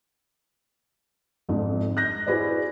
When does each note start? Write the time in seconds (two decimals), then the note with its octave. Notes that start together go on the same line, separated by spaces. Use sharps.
1.49 G1 F2 G#2
1.97 F#6 G6 A#6
2.26 E4 F#4 G#4 B4 C5 D5